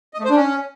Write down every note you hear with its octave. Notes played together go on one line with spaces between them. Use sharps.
D#5
A3
C5
D4
C#4